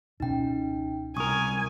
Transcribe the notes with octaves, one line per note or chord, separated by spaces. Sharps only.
C#2 B2 C#4 D#4 G5
C2 A#4 G#5 C#6 D#6